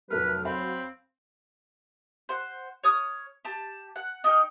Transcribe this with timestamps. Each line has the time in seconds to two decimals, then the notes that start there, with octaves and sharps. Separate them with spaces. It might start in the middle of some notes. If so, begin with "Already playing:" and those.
0.10 F1 F#3 A3 A#4 B4 F6
0.45 C4 C5 F5 B5
2.29 C5 F#5
2.84 C#5 D#6 F6
3.45 G4 A5
3.96 F#5
4.24 D#4 G5 F6